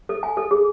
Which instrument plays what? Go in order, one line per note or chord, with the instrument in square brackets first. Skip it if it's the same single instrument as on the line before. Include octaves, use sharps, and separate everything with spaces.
[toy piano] A4
G#5
A4
G#4